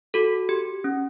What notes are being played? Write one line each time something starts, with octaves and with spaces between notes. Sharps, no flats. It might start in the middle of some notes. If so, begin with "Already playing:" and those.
F#4 A4
G4
C#4